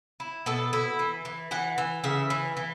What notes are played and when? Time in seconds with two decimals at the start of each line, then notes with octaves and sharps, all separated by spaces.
0.20 E4
0.46 B2 A4
0.73 E4
0.99 E3
1.25 E3
1.51 E3 F#5
1.78 E3
2.04 C#3 E5
2.30 E3
2.57 E3